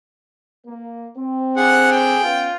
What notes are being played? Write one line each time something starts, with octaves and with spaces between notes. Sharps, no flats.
A#3
C4
D3 G#4 F#5
G5
B3 C#4 F4